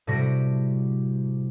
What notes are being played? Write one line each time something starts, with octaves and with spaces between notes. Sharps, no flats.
A2 C3 G3 F#4 A#6 D7